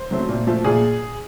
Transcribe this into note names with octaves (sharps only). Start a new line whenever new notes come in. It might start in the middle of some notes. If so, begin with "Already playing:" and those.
Already playing: C5
F#3 A3 C4
A#2
F3 A3
A#2 G#4